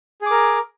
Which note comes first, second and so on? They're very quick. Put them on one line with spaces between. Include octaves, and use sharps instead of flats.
G#4 D6 A#4